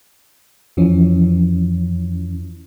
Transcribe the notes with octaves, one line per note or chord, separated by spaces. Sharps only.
F2 E3 F3 C#4